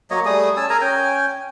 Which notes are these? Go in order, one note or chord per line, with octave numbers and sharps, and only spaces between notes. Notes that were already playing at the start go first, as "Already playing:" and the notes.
F#3 A#3 C#5 D#5
G3 A3 G#4 D#6
C#4 G#5 A5 E6
G#4 A#4 G#5 A#5
C#4 G5 G#5